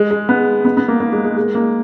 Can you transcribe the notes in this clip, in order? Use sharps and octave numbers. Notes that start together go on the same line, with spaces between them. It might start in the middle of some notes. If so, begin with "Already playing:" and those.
Already playing: G#3
G#3
B3
B3
B3
A#3
A#3
G#3
G#3
G#3
A#3